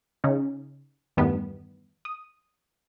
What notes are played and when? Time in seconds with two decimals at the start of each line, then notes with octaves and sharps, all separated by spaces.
0.24 C#3 C#4 D#4
1.17 E2 G2 D#3 G3 A3 B3
2.05 D#6